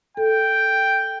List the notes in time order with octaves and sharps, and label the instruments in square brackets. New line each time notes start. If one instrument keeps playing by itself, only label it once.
[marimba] A4 [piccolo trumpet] G5